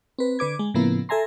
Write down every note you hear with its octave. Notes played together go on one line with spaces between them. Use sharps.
C4 B4
D3 B4 D6 G#6
G#3
A2 C#3 F3 A#3 B3 E4
A4 E5 G#5 A#5 C6